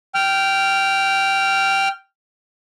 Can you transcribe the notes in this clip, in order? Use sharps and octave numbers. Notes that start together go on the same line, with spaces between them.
G5 F6